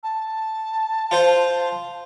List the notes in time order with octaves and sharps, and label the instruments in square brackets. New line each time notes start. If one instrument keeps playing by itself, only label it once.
[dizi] A5
[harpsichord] F4 C5 F5